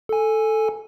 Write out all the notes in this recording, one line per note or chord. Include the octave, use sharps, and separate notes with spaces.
A4 G#5